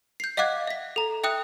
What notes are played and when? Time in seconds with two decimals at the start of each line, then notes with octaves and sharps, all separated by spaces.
0.20 G6 C7
0.37 D#5 F5 F#5 D6 F#6 G#6
0.67 E5 B6
0.96 A4 A#5
1.24 E5 G5 D#6 F#6